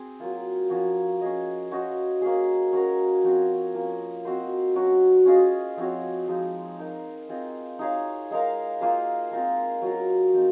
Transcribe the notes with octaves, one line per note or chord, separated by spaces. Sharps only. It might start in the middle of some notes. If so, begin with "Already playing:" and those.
Already playing: C4 G#4
F#3 A#3 F4
F3 A#3 C#4 F#4
C#4 G#4 D#5
C#4 F#4 C5 D#5
A#3 C#4 G#4
C#4 F#4 A#4
F3 C4 F#4 C#5
F3 A#3 C#4
C4 F#4 C5 D#5
F#3 C#4 F#4
C#4 F4 G#4 D#5
F3 C4 F#4 C#5
F3 G#3 D#4
D#4 A#4 F5
C4 F4 G#4 D#5
D#4 G#4 C#5 F5
G#3 D#4 A#4 F5
A#3 F4 G#4 C5
G#3 C4 F4 A#4
F#3 C#4 F4 A#4
F3 C4 D#4